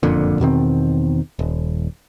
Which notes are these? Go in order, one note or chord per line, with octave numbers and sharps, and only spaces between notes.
F#1 F2 A#2 D3
E2 B2 D#3 C4
D#1